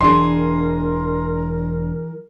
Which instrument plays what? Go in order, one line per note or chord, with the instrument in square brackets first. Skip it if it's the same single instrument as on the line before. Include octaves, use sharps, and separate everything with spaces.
[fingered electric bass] E1 D4 [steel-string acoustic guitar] E3 G#4 [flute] A#4 [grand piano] C6